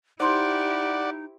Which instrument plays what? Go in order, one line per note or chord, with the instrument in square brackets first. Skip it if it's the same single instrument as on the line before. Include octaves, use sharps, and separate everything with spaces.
[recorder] D#4 [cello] E4 G4 [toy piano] C5 C6 D6 [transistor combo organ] D5 F#5